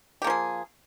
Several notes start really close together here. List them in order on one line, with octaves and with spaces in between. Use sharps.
G4 A#3 F3 G#4